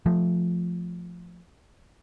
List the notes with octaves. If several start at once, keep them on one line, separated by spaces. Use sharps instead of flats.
F3 A3